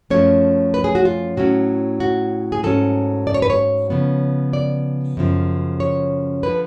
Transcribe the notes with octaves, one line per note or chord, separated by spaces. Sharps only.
F#2 F3 A3 C#4 C#5
B4
G#4
F#4
F4
A2 F#3 C#4 F#4
F#4
G#4
G#2 F#3 C#4 A4
D5
C#5
B4
C#5
C#3 F3 B3
D5
F#2 C#3 F3
C#5
D3 F3 B4